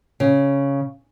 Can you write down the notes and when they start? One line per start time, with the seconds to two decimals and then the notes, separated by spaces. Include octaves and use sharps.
0.20 C#3